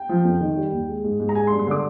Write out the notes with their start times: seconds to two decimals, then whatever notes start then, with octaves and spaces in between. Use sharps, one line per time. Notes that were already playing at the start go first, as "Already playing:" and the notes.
Already playing: G5
0.09 F3
0.24 F2
0.40 D#3
0.57 G3
0.72 D#2
0.88 G#3
1.04 G#2
1.20 G#2
1.29 A#5
1.35 G#3 G#5
1.47 C6
1.51 G2
1.59 C6
1.67 D3 D6